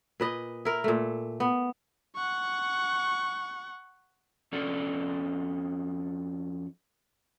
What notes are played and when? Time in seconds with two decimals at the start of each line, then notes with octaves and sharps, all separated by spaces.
0.20 A#2 B4 D#5
0.65 E4 A#4
0.84 A#2 A3
1.40 B3
2.16 F#5 C#6
4.52 F2 C#4 A4 D5